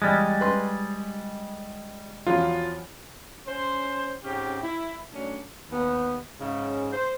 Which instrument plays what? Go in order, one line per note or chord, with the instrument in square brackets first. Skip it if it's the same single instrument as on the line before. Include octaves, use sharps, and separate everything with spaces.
[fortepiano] E2 [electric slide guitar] G3 G#3
[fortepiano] B4 C6
[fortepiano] E2 F3 F#3 [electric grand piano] F4
[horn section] C#4 C5
G#2 C#3 C4 C#4 G4
E4
F#3 A3 C#4 D4
[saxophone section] D#2 B3
G#2 C#3
C5